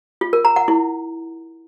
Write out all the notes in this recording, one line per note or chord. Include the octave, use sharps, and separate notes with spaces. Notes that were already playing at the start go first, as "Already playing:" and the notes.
F4
A#4
A#5
F#5
E4